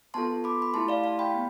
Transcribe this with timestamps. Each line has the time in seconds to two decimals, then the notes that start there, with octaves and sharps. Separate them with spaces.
0.14 B3 F4 A4 A5 C6
0.44 B5 D6
0.62 B5
0.74 A3 E4 G4 A5 C6
0.88 D5 F5
1.04 F5 A5
1.19 G5 B5
1.34 B3